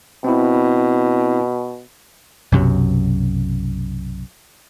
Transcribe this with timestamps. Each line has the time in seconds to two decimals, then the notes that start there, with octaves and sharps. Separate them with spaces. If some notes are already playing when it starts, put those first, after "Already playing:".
0.24 B2 C4 E4
2.52 B1 F#2 C3 F#3